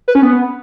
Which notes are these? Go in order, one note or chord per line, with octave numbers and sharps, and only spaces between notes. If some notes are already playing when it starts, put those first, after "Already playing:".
B4
C#4
B3